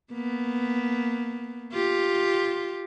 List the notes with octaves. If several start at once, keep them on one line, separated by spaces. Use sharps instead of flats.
A#3 B3
F4 G4